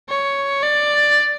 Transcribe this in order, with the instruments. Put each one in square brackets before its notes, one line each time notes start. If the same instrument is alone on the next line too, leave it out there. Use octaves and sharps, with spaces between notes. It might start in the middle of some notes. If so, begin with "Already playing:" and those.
[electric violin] C#5
D5